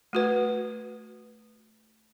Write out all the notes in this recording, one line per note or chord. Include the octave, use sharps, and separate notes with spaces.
A3 F#4 B4